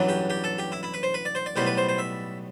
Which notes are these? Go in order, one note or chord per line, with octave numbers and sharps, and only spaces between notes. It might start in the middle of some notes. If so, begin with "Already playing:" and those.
Already playing: A1 G2 F#3
G4
G4
A4
G4
E4
E4
B4
C5
B4
D5
C5
D5
B1 A2 G3 B3 C5
B4
C5
C5
E5